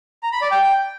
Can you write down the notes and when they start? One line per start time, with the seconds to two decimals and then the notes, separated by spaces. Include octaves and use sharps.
0.23 A#5
0.32 B5
0.42 D5
0.51 G5